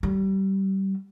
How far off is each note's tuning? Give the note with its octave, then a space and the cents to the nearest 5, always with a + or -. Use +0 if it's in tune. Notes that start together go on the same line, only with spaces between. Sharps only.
G3 -25